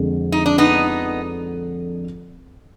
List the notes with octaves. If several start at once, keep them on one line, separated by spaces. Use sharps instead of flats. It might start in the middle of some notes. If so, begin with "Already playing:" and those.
Already playing: F2 D3 G#3
D#4
D4
B3 D#4